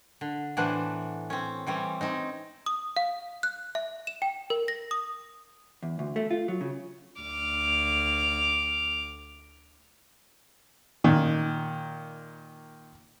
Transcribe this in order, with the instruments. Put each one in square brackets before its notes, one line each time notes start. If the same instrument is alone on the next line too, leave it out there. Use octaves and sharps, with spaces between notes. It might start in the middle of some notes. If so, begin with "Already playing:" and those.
[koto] D3
A2 E3 B3 D4 C5 F#5
C4 C#4
E3 G3 C4 C#4
C4 C#4 D#4
[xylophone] D#6
F5
F#6
E5
E7
G5
A#4
A#6
D#6
[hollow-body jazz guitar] E2
D2
A3
F4
F#3
C#3
[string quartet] D2 D6 F6
[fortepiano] A#2 D#3